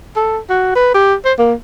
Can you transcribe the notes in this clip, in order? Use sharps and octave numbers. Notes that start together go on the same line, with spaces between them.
A4
F#4
B4
G4
C5
A#3